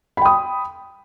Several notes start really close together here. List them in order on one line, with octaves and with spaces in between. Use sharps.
B5 G5 D#6